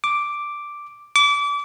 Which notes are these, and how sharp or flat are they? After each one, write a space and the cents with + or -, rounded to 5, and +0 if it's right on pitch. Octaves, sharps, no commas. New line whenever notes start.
D6 +0
D6 -30